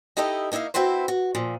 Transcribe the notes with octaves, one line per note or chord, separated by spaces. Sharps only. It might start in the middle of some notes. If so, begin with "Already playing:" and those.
D#4 E4 G4 A4 D#5
A#3 D#4 E4 E5 F5
C4 E4 F#4 B4 C5
F#4
A#2 F3